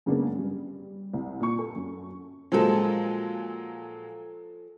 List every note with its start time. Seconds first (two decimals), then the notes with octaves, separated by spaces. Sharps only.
0.06 F#2 C#3 G#3 A#3 B3 D4
0.39 G3
1.13 C2
1.40 A#2 C#6
1.59 A4
1.76 F#2
2.52 A#2 F3 F#3 G#3 A4